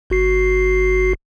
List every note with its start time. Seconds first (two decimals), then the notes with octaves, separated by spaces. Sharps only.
0.10 G1 F#4 C7